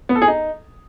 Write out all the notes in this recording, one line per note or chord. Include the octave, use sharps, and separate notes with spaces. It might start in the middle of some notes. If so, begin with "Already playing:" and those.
B3
A4
G#4
D#4